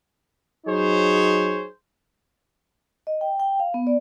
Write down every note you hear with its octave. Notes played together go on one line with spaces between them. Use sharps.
F#3 D#4 G#4 C5 C#5
D#5
G5
G5
F5
B3
D5